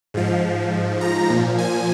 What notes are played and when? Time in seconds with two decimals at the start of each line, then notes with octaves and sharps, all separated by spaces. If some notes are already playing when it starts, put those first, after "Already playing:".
0.14 G#2 F3
1.01 A#5
1.30 A#2 F3
1.58 G#5